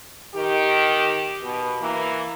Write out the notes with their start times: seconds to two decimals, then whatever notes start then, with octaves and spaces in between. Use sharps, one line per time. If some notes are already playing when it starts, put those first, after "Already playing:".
0.33 D#3 G4
1.41 B2
1.79 E3 A#3